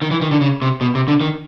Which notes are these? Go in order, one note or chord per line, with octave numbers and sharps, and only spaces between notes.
D#3
E3
D#3
D3
C#3
C3
B2
C3
D3
D#3